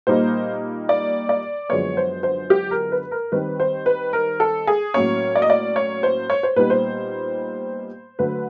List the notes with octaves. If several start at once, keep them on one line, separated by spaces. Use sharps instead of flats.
A#2 G3 A#3 D#4 C5
D5
D5
F#2 D3 F3 G#3 B3 C#5
C5
C5
G4
A#4
B4
A#4
D#3 G3 C4 B4
C5
B4
A#4
A4
G#4
A2 F#3 A#3 C#4 C#5
D5
D#5
D5
C#5
C5
C#5
C5
A#2 G3 B3 D#4 B4
C5
D3 F#3 A3 B4